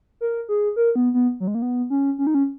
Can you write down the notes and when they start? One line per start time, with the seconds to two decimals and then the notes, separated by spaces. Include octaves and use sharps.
0.21 A#4
0.49 G#4
0.76 A#4
0.96 B3
1.14 B3
1.40 F#3
1.47 G#3
1.55 A#3
1.62 B3
1.90 C#4
2.19 C#4
2.27 D#4
2.35 C#4